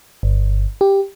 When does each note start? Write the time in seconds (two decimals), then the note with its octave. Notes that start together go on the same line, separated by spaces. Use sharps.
0.23 G1
0.81 G4